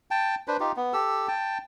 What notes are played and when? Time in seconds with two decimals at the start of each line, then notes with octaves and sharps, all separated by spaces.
0.11 G5 A5
0.48 D4 B4 C5
0.60 D#4 F4 G4
0.76 B3
0.93 G4 A4 E6
1.28 G5 A5